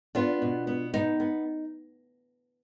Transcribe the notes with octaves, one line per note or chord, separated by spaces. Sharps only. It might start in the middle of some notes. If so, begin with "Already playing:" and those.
B3 D4 F4
B2
B3
B3 D#4
B3